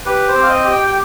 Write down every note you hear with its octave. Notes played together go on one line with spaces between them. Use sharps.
G4 B4
C5
C4
F5
D#5
G4
G5
G5